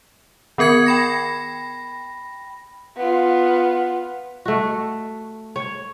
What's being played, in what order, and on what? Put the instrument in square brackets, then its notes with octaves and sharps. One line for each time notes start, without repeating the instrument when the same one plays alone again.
[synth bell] D#3 B3 A#4 G#6 C#7
G5 B5 A#6
[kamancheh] B3 F4
[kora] A3 F#4
C#5